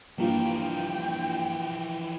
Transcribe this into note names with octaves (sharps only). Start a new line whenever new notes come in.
G2 E3 F3 A#3 F4 G5